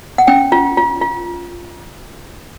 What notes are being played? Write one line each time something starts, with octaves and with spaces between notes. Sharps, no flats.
F#5
C#4 G5
F4
F4
F4